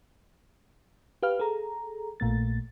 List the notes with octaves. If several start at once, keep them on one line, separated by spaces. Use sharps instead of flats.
G4 B4 F5 F6
G#4 A4 A#5
A#1 A#2 A3 A6